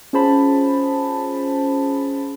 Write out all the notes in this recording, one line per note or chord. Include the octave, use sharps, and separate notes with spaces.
C#4 F4 G#4 C5 A5 B5